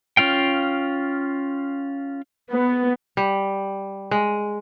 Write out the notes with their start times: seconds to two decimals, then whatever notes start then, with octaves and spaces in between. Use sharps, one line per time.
0.17 C#4 F4 F5 G5
2.50 B3
3.17 G3
4.11 G#3